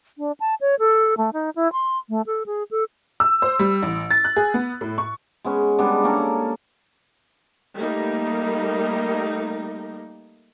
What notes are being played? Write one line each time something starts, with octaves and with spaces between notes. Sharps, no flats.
D4
A5
C#5
A4
A3
D#4
E4
C6
A3
A4
G#4
A4
E6
C5
G3
A1
A6
F#6
G#4
B3
A2
C#6
G#3 B3 C#4
G3 G#3 B3 D4
A#3 C#4 A4 A#4
G3 A3 A#3 D#4